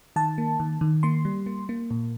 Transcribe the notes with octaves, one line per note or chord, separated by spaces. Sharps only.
D#3 A5
A#3
D#3
D#3
A#3 C6
G3
A#3
A#3
A#2